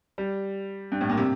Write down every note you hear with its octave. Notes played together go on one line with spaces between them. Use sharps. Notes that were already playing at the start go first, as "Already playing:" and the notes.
G3
G2
A2
A#2
C3